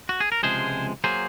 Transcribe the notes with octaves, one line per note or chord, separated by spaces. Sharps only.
F#4
G#4
A#4
C#2 C3 F3 G#3 G#4 C5
F#3 A#3 G#4 C5